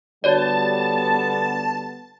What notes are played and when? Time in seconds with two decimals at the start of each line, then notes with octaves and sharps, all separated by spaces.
0.24 D3 G3 B3 F#4 C#5 D5 A5